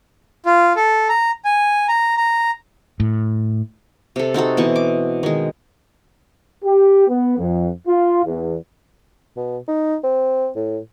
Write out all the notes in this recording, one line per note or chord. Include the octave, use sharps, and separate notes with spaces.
F4
A4
A#5
G#5
A#5
A#5
A2
C3 A4
C4 D#4 F#4 A4
B2 E3 C4 C#6
D6
D#3 G#3
G4
B3
F2
F4
E2
B2
D#4
C4
A2